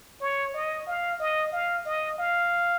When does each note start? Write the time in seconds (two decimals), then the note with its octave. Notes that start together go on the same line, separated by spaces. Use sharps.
0.21 C#5
0.54 D#5
0.87 F5
1.19 D#5
1.52 F5
1.85 D#5
2.18 F5